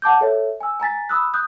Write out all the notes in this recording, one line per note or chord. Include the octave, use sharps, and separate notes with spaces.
F#5 A5 D6 G6
A4 C#5 E5
G#5 E6
G#5 A#5 A6 B6
B5 D#6 E6 F#6
D#6 F#6 G6